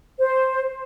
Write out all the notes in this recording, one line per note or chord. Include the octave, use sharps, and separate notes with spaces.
C5